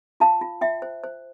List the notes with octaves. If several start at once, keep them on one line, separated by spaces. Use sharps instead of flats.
F4 F5 A5
F4
F4 E5 G5
C5
C5